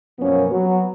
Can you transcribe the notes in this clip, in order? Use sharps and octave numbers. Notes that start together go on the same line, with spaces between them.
F#2 B2 F3 A#3 B3 C#4
F#3 B3